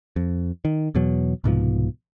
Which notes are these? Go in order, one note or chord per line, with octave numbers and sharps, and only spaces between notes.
F2
D#3
E2 B2 F#3
C2 G#2 B2 F3